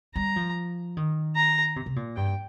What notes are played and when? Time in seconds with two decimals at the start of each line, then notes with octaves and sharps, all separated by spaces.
0.15 G3 A#5
0.36 F3
0.97 D#3
1.36 A#5
1.76 C3
1.86 C3
1.96 A#2
2.16 G2 G5